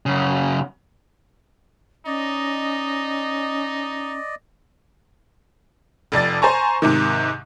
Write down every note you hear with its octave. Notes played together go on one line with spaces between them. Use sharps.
F#2 C#3
C#4 D#4 D5 D#5
F1 F2 D5 A6
C5 G#5 A#5 C#6
G#2 C3 D#3